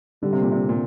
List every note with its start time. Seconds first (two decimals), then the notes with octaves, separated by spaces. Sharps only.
0.23 D3 G3
0.33 C3
0.42 A#2
0.52 C3
0.69 A#2